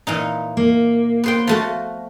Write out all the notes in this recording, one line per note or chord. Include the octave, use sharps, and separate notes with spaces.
A#2 E3 D#4
A#3
B3 C5 G5
F3 A3 F#4